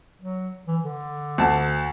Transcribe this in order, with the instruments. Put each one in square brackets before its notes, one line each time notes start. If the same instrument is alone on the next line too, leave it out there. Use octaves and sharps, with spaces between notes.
[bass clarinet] F#3
E3
D3
[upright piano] D2 A5